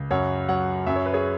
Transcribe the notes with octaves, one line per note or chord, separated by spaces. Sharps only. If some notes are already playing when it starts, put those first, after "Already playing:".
Already playing: C#2
F#2 C#5 F#5
F#3 C#5 F#5
F#2 E5
C#5
B4
G#4 C#5